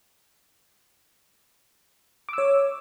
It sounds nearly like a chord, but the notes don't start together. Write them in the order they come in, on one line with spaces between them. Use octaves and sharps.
D6 E6 C#5